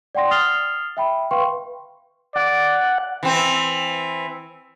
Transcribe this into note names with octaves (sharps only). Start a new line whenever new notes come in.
D5 F#5 G5 C6 A#6
D#6 F6 A6 C7 F7 G7
E5 G5 B5
B4 F5 G5 C6 C#6
D5 F#5
E3 C4